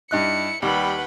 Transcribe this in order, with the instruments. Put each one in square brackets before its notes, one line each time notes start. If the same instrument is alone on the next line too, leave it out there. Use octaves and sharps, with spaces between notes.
[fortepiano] G2 D#4 F#6 [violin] E4 C#7
[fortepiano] D#2 [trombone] G3 [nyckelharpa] B4 F#5 [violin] G5 B5